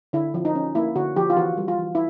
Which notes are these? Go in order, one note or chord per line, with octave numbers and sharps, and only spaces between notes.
D3 E4
F3
D#4
C#4
A#3 E4
D3 F#4
F3 G4
F4
E3 F#4
G3
F4
E3
E4